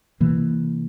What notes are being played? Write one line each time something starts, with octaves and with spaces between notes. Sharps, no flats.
C3 E3 A#3